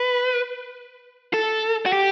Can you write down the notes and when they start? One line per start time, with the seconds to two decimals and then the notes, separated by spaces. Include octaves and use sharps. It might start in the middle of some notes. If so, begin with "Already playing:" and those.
Already playing: B4
1.34 A4
1.86 F#4
1.93 G4